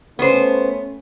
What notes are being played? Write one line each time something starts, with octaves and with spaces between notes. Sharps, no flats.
A3 B3 C#4 C5